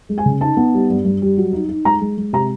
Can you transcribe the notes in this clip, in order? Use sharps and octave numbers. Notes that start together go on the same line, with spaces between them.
G#3
G#5
C#3
D#4 A5
B3
G3
G2
G2
G3
F#3
D#4
D#4
G#3 A#5
G#3
G#3
C3 A#5